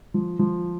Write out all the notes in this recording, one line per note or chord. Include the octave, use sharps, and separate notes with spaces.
F3
F3